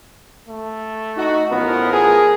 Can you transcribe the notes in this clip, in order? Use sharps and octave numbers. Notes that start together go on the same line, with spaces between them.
A3
D#4 F#4
A1 F3 B3 A#4
G#4